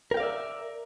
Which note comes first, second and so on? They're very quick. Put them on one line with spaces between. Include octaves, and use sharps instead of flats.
A#4 G5 F5 D5 E5